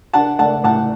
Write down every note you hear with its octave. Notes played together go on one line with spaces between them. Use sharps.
D4 F#5 A5
A3 F#5 A5
A2 F#5 A5